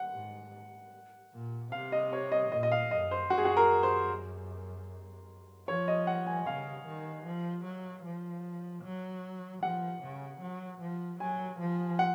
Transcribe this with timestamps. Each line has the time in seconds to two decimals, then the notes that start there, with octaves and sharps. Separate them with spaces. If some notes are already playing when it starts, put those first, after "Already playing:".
Already playing: F#5
0.14 G#2
1.33 A#2
1.72 C3 F5
1.92 D#5
2.13 C#5
2.32 D#5
2.51 A#2 D#5
2.63 D#5
2.72 F5
2.91 F#2 D#5
3.11 C5
3.30 F#2 F#4
3.38 G#4
3.45 F#4
3.57 A#4
3.83 C5
5.67 F3 C#5
5.88 D#5
6.07 F#5
6.27 G#5
6.46 C#3 F5
6.86 D#3
7.25 F3
7.65 F#3
8.04 F3
8.83 F#3
9.63 F3 F#5
10.02 C#3
10.41 F#3
10.81 F3
11.20 F#3 G#5
11.60 F3
11.99 F#5